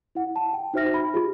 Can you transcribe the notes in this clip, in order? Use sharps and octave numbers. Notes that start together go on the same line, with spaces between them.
E4 F#5
A5
G5
D#4 F#4 C5 E5 F6 A#6
B5
F4 G4 G#4